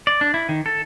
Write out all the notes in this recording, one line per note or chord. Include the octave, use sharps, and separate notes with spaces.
D5
D4
E4
D#3
A4